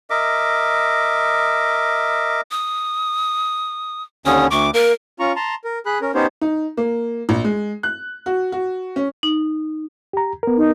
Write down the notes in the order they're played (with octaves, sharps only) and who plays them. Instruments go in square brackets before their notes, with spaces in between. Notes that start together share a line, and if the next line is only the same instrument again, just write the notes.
[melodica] A#4 D#5 E5 D6
[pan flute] D#6
[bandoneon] D#2 D3 C#4 [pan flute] D#6
[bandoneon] D2 D6 [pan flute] C#6
[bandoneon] A#3 [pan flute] A#4
[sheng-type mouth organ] C#4 F4 A#5 C#6
A5 A#5 C6
A#4
G#4 B5 F#6
C#4 A#4
B3 C#4 D#4 G4 C5 C#5
[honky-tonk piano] D#4
A#3
A#1
G#3
F#6
F#4
F#4
C#4
[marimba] D#4
[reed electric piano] G4 A#5
B3 A#4
[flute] D#4